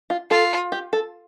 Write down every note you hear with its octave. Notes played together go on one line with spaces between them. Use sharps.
F4
F4 A4
G4
A4